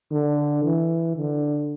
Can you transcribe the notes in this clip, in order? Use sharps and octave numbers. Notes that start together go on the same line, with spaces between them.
D3
E3
D3